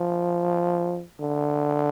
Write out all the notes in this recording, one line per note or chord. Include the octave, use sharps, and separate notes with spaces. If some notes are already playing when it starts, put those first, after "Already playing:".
Already playing: F3
D3